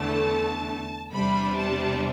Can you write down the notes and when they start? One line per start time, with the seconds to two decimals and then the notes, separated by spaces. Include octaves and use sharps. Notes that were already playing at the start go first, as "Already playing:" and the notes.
Already playing: E2 D3 A3 A5
1.11 E2 C3 G3 D4 B5
1.57 A5